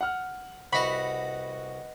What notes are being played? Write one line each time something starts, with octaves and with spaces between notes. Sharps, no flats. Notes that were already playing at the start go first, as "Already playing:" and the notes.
F#5 F6
C2 F#4 B4 D#5 F#5 B5 C#6